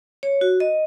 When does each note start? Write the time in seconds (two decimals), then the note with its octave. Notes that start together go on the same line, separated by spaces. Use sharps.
0.23 C#5
0.41 F#4
0.60 D#5